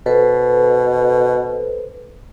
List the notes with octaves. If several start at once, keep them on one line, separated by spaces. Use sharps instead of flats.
B2 A4 B4 C5